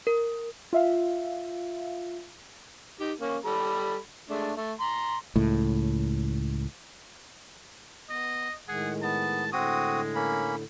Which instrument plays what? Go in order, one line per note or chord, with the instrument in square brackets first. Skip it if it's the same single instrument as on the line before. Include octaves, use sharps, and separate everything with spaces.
[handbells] A#4
[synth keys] F4 E5 F5
[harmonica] D#4 G4
A#3 C#4
G3 A4 B5
G#3 A3 D4
A3
A#5 C6
[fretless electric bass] C#2 A2
[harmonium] B3 [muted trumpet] D#5
[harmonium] A2 D#3 G#3 [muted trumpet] G#4 [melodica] F#5
[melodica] B3 [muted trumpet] A5
[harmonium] A2 D3 [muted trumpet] G#3 [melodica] C4 F#4 D#6
[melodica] A#3 C#4 B5